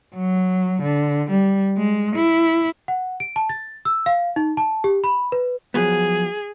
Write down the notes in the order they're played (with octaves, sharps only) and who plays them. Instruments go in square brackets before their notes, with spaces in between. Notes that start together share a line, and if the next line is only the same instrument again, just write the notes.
[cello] F#3
D3
G3
G#3
E4
[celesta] F#5
D7
A5
A6
E6
F5
D#4
A5
G4
B5
B4
[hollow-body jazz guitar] F3 F#3 B3 [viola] G#4